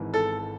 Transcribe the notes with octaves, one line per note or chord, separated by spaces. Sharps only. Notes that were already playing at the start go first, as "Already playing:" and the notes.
Already playing: G#1 G#2 E3
A4